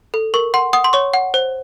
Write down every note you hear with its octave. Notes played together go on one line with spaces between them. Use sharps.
A4
A#4 C#6
F#5 C6
F#5 D#6
C6
C#5 C#6
F#5
C5